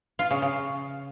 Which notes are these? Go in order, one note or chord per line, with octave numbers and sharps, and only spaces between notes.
F4
C#3
C#3